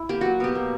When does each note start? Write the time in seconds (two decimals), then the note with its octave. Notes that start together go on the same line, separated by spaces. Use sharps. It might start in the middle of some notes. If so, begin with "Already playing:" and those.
Already playing: E4
0.09 A#3 G4
0.21 F#3 F#4
0.40 B2 G4
0.55 A#3